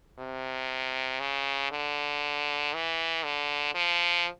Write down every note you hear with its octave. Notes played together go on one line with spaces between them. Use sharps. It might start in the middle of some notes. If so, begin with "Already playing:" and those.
C3
C#3
D3
E3
D3
F3